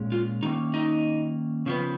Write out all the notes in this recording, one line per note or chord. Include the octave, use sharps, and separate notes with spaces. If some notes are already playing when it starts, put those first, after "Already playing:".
Already playing: A#2 G#3 C#4
F4
D#3 A#3 C#4 D#4
D#4
C#3 F3 B3